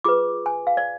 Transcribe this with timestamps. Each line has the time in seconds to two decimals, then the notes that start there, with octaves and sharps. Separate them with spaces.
0.04 F4 G#4 B4 D6
0.46 G#5
0.67 F5
0.77 D5